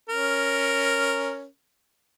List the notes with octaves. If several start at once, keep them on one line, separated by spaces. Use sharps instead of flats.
C#4 A#4